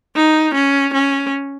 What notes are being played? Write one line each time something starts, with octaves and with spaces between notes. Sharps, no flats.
D#4
C#4
C#4